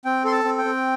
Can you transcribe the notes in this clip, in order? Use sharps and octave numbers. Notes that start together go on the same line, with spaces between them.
C4 G5
A4 C6
A5
C4
G5
C4